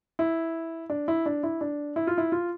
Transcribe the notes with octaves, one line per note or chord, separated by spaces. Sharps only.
E4
D4
E4
D4
E4
D4
E4
F4
E4
F4